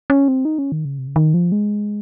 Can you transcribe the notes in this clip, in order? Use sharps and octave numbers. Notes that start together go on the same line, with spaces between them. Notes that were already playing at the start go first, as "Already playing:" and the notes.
C#4
C4
D#4
C#4
D#3
C#3
C3
C#3
D#3
F3
G#3